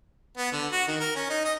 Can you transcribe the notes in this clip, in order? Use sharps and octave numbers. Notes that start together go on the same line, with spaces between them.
B3
D3
F#4
D#3
A#4
C#4
D#4
D#5